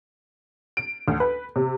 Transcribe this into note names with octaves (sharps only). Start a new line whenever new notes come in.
D7
D2
B4
C3